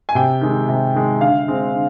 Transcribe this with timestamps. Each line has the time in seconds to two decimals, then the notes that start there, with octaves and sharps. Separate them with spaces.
0.09 G#5
0.15 C3 G5
0.41 D#3 G#3
0.69 C3
0.94 D#3 G#3
1.21 D3 F5
1.48 G#3 C4
1.74 D3